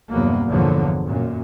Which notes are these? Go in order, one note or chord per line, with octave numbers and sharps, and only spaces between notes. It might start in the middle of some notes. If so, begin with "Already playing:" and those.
E2 G2 C3 F#3 A#3 B3
G1 E2 A#2 D3 F3 F#3
F#2 A#2